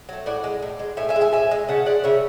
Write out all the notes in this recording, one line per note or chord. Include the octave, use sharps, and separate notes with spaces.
F#3 A3
A2 D5 F#5
G#3
A2
G#3
A2 E5 G#5
E5 G#5
G#3
E5 G#5
A2 E5 G#5
G#3
C#3 F#5 A5
G#3 D5 F#5
C#3 C#5 E5